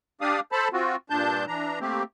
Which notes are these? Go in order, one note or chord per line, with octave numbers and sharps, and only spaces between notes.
D4 G4 D5 F5 D#6
A4 C5 A5 B5
C4 F4 F#4
G2 A#2 D4 A5 G6
E3 D4 A#5
A3 A#3 C4 G4